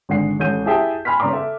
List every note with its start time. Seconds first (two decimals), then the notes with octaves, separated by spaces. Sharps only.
0.09 G#1 D3 G#3 F#5 C7
0.40 A1 G#3 A4 G6 D#7
0.65 E4 G4 G#4 E5 G5 A5
1.05 G#5 B5 C6 F6 B6
1.20 C#3 B3 D5 A#5 C6 D6
1.33 A4 E5